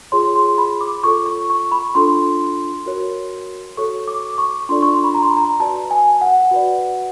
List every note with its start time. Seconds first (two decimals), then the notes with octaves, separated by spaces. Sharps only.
0.12 F4 G#4 C#5 C6
0.36 C6
0.58 B5
0.81 D6
1.04 F4 A4 C#5 C#6
1.26 C#6
1.50 C#6
1.72 B5
1.95 D4 F4 A4 C6
2.86 F#4 A#4 C#5
3.77 F#4 A4 C#5 C#6
4.08 D6
4.38 C#6
4.69 D4 F4 A4 D5 C6
4.82 C#6
4.93 C6
5.04 B5
5.14 A#5
5.22 C6
5.30 B5
5.37 A#5
5.60 F#4 B4 D5 A5
5.91 G#5
6.21 F#5
6.51 F#4 B4 D5